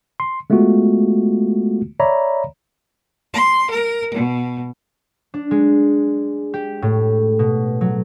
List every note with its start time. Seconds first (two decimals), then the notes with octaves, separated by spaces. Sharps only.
0.20 C6
0.50 G#3 A3 B3 F4 F#4
2.00 C#5 D5 E5 A#5 B5
3.33 C6
3.70 A#4
4.13 B2
5.34 D4
5.51 G#3
6.54 G4
6.82 A2
7.39 B2
7.81 F#3